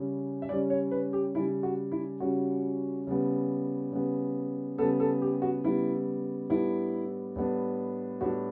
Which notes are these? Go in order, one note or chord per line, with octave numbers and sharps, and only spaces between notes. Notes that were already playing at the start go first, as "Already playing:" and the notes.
Already playing: C#3 G3 C#4
E5
C#3 G3 C#4 D5
C#5
B4
G4
C#3 G3 C#4 E4
F#4
E4
C#3 G3 C#4 F#4
C#3 G3 B3
C#3 G3 B3
C#3 G3 B3 A4
A4
G4
F#4
C#3 G3 B3 E4
A2 G3 B3 D4 E4
A2 G3 B3 D4
A2 G3 B3 D4 F#4